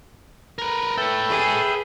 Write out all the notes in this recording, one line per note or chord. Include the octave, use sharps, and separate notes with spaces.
A#4 B4
A4 B4 C#5 E5 G5
G#4